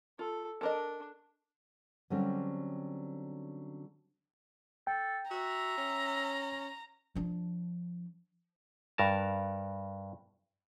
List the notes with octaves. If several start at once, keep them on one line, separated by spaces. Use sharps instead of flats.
F4 A4
D4 A4 A#4 D#5
D3 F#3 G3 C4 C#4
A4 G5
F#4 E5 A#5
C#4
F3 D4
G2 A#4 A5